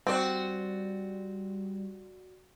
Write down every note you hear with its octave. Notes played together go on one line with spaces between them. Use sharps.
G3 C4 F#4 D5